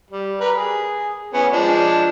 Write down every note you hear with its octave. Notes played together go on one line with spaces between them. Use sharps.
G3
A#4 B4
G#4
B3 C#4 G#5
F3 G#3 D4